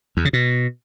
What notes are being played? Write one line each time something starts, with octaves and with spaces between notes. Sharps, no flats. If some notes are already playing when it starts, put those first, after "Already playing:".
E2
C#3
B2